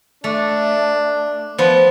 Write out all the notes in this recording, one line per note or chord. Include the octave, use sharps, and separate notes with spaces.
A3 D4
F3 B3